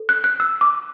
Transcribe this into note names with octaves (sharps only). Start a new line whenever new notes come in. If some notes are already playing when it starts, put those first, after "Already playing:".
Already playing: A4
F#6
F#6
E6
D6